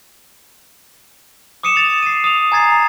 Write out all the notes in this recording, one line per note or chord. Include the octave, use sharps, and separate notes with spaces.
D6 D#6 C#7 D#7 E7
A6 E7 F7
C7 D#7
D#6 F7
G#5 A#5 G#6 A6 C7
A#5